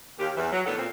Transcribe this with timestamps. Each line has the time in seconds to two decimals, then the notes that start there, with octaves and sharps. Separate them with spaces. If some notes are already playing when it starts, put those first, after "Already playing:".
0.19 D#2 G4
0.36 E2 E3
0.52 F#3
0.66 A2 D#3 B3 D4 A4 F#5
0.78 A#2 C4